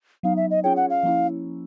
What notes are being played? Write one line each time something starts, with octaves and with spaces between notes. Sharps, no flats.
F#3 B3 D#4 F5
E5
D#5
C#4 F4 G#4 C#5 G5
F#5
F5
F3 A#3 C#4 E4